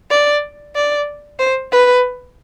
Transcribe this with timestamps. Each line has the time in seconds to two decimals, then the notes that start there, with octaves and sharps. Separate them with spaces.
0.10 D5
0.75 D5
1.39 C5
1.72 B4